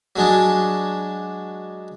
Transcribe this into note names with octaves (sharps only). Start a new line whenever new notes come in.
F#3 G#3 D4